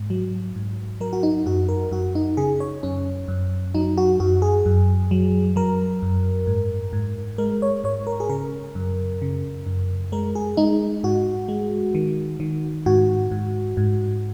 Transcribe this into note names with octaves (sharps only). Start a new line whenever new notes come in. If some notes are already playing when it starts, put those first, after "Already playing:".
Already playing: G#2
F#3
G#2
F#3 A#4
F#4
D#4
F#2 F#4
A#4
F#2 F#4
D#4
C#3 G#4
C#5
F#2 C#4
F#2
F#3 D#4
F#4
F#2 F#4
G#4
F#2
F#3
F#3 A#4
F#2
G#2
G#2
G#3 A#4
C#5
G#2 C#5
A#4
G#4
C#3 A#4
F#2
C#3
F#2
G#3 A#4
G#4
G#3 D#4
G#2 F#4
G#3
D#3
D#3
G#2 F#4
G#2
G#2